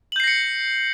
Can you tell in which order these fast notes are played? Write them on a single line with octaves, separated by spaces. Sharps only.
F#7 G6 C7 A#6 C#7